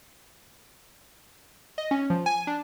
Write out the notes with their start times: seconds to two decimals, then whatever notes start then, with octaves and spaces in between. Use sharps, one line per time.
1.78 D#5
1.91 C#4
2.10 F3
2.26 G#5
2.47 D4